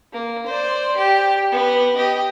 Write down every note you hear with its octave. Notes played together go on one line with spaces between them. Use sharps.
A#3
C5 D5
G4
B3
G4 D#5